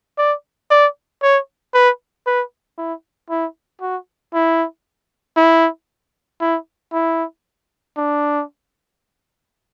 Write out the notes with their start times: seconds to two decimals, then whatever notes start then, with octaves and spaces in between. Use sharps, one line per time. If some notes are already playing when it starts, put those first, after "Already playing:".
0.18 D5
0.71 D5
1.23 C#5
1.74 B4
2.26 B4
2.78 E4
3.30 E4
3.81 F#4
4.34 E4
5.37 E4
6.41 E4
6.92 E4
7.97 D4